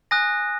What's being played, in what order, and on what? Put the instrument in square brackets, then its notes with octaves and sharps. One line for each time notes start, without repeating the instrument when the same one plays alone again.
[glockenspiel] G#5 D#6 F#6 A#6